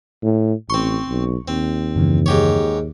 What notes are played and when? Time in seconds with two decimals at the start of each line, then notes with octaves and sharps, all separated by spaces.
0.23 A2
0.70 A1 C4 C6 C#6
1.09 B1
1.48 D#2 C4
1.96 F#2 C#3 E3
2.26 G#2 G4 C#5